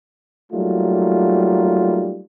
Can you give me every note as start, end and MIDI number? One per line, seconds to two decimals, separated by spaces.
0.52 2.22 54
0.52 2.22 55
0.52 2.22 57
0.52 2.22 58
0.52 2.22 63
0.52 2.22 65